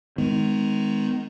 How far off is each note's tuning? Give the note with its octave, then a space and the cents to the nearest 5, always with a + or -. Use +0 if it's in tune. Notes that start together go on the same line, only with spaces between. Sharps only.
D#3 +0 G#3 +0 B3 +45